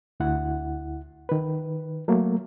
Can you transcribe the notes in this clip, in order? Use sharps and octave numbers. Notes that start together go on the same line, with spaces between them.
D2 E4 F#5
D#3 B4
F#3 A3 A#3